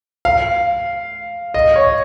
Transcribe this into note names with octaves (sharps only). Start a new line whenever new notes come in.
F5
D#5
C#5